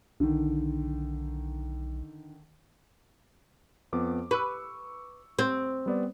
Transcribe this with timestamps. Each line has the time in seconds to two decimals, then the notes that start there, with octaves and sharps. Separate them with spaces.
0.20 B1 D3 D#3
3.93 F2 B3 D6
4.31 B4 C#6 E6
5.39 C4
5.86 G3 B3 D5